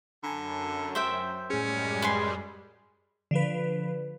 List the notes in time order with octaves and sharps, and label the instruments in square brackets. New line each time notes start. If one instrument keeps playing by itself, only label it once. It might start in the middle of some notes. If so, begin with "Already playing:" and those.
[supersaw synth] F#2 [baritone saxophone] D3 [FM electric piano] G#5 A#5 B5
[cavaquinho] C5 E5 G5
[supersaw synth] F#2 G3 G#3 [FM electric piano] A2 G#4 [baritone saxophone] C#4
[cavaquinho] B4 G#5 C6
[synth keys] D3 F3 B4